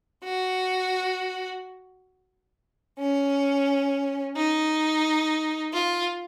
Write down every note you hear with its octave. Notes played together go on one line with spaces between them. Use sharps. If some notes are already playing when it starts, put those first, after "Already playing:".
F#4
C#4
D#4
F4